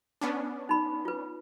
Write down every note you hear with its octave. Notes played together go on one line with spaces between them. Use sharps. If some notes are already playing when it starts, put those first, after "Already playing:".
B3 C#4 D4
D#4 B5
F4 B4